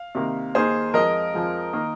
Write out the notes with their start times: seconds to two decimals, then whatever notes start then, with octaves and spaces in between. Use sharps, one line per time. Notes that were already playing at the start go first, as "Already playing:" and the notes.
Already playing: F5
0.15 C3 D#3 A#3
0.55 D#2 D#3 A#3 D#4 G#4 C5
0.94 F2 F3 G#3 A#4 D#5
1.34 F2 F3 G#3
1.73 D#3 A#3